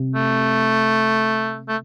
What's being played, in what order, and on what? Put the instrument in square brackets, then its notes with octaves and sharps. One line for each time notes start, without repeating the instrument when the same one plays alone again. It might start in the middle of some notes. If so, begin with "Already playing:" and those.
Already playing: [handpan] C3
[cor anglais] A3
A3